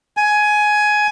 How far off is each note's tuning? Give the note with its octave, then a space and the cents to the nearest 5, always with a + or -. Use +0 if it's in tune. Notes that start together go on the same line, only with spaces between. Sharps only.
G#5 +15